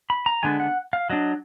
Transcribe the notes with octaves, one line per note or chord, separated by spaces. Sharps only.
B5
A#5
D3 G#3 B3 D4 G#5
F#5
F5
F#3 D4 D#5